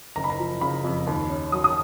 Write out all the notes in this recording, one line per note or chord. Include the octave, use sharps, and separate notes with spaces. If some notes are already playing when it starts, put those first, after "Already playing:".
F#1 A#5
B5
A#5
F3
C#3 B5
F2
D#2
C#4
F#3 D#6
D#6